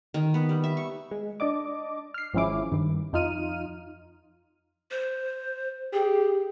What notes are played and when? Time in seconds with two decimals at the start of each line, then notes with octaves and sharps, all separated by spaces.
0.14 D#3
0.34 B3
0.49 G3
0.64 E5
0.77 C#6
1.11 G#3
1.40 D4 D5 D#5 D6
2.14 F6 C7
2.34 G#1 F3 G#3 C#4 E4 D6
2.72 G2 D#3
3.13 F2 D#4 F4 F6 D#7
4.91 C5
5.94 G4 G#4